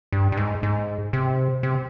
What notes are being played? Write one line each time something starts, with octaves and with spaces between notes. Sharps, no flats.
G2
G2
G#2
G#2
C3
C3